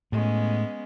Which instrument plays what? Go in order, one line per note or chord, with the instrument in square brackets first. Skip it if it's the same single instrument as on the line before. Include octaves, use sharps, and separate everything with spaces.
[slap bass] A2 [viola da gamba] G#3 B3 C#4